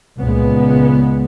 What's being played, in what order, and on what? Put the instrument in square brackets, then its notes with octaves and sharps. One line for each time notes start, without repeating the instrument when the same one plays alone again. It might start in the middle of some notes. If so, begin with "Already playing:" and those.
[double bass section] C#2 A#2 G#3 B3